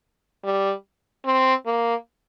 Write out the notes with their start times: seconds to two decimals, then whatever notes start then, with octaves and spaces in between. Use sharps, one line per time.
0.44 G3
1.25 C4
1.66 A#3